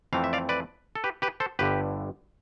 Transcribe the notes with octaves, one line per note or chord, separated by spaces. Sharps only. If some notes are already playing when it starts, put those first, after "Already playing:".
F2 E3 A3 C4 F5
E5
D5 F5
B4 D5
A4
G4 B4
G4 B4
A4 C5
G1 G2 D3 G4 B4